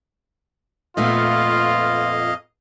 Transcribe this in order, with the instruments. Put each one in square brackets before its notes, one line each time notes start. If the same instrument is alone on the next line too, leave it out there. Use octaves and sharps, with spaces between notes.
[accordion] F2 D#5 F5 [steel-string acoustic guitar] A#2 A3 B3 [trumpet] F4